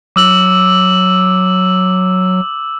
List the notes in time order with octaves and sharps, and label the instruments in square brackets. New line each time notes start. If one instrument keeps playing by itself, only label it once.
[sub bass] F#3 [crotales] D6 E6 F#7